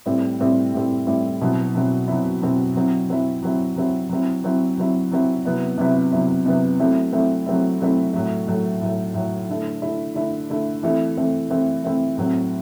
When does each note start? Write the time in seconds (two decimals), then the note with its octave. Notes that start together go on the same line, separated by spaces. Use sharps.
0.06 A2 G3 C4 E4
0.40 A2 G3 C4 E4
0.74 A2 G3 C4 E4
1.07 A2 G3 C4 E4
1.41 B2 F#3 C4 E4
1.75 B2 F#3 C4 E4
2.08 B2 F#3 C4 E4
2.42 B2 F#3 C4 E4
2.76 F#3 C4 E4
3.09 F#3 C4 E4
3.43 F#3 C4 E4
3.76 F#3 C4 E4
4.09 F#3 C4 E4
4.44 F#3 C4 E4
4.78 F#3 C4 E4
5.12 F#3 C4 E4
5.45 C3 F#3 B3 E4
5.78 C3 F#3 B3 E4
6.12 C3 F#3 B3 E4
6.46 C3 F#3 B3 E4
6.80 F#3 A3 C4 E4
7.12 F#3 A3 C4 E4
7.46 F#3 A3 C4 E4
7.80 F#3 A3 C4 E4
8.13 A2 F#3 A3
8.47 A2 F#3 A3
8.81 A2 F#3 A3
9.14 A2 F#3 A3
9.49 D3 A3 E4
9.82 D3 A3 E4
10.15 D3 A3 E4
10.50 D3 A3 E4
10.83 E3 A3 C4 E4
11.17 E3 A3 C4 E4
11.50 E3 A3 C4 E4
11.84 E3 A3 C4 E4
12.18 A2 F#3 C4